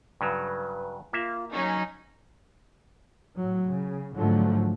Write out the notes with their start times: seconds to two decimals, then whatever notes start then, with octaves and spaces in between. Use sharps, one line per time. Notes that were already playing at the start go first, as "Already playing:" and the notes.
0.21 G2 C#3 F#3 B4
1.13 A#3 F4 E5
1.52 F#3 C#4 D#4 C#6
3.38 A2 F#3
3.68 C#3
4.15 G#2 D3 F3 F#3 A3